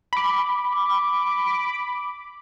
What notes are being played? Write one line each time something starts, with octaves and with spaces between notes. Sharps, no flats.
B5 D6